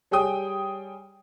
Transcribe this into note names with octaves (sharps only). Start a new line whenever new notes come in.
G3 G#4 C#5 G5 D#6